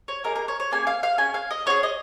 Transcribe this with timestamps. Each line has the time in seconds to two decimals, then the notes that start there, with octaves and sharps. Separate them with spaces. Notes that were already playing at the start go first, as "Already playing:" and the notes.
0.08 C#5
0.24 A#3 D#4 G#4 A#4
0.36 A#4
0.48 C#5
0.60 C#5
0.71 A#3 C#4 G#4 G#5
0.87 F5
1.03 F5
1.18 C#4 G#4 G#5
1.34 F5
1.51 D#5
1.66 C#4 F4 C#5
1.70 G#4
1.83 D#5